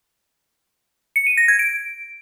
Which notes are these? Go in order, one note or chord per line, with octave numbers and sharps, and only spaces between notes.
C#7
D#7
A#6
G#6
D7